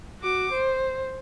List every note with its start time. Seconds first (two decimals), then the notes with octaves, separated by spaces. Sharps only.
0.21 F#4 D6
0.52 C5